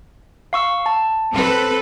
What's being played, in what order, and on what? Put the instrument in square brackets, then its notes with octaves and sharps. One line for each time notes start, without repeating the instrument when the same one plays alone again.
[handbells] F5 C#6 E6
A5
[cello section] C4 A4 B4